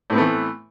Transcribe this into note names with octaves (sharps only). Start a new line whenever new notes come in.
A2 E3 A3 B3 C4